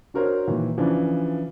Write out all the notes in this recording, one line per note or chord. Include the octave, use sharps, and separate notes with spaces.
D4 F#4 A#4 C5 C#5
A#2 D#3 E3
C#3 E3 F3 D4